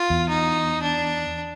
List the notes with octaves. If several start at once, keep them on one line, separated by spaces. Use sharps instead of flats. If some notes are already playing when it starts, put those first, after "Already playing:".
Already playing: F4
E2
D#4
D4